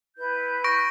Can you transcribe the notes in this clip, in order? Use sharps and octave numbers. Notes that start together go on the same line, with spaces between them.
E4 B4 G6
C#6 A#6 D7